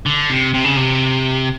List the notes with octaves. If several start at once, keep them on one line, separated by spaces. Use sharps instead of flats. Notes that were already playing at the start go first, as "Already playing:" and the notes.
D3
C3
C3
C#3
C3